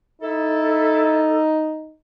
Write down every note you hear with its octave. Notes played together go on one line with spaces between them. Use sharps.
D#4 E4 A4